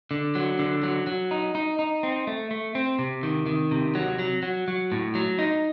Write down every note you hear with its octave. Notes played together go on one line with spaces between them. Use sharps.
D3
F#3
D3
F#3
F#3
D#4
D#4
D#4
C4
A3
A3
C4
C3
D#3
D#3
C3
F#3
F#3
F#3
F#3
A2
F#3
D#4